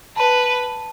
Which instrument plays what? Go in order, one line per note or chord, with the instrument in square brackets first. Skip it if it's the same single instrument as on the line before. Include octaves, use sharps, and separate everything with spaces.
[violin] B4 [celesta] A5